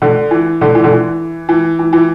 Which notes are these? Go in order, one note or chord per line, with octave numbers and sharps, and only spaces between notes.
D3
E3
D3
E3
D3
E3
E3
E3
E3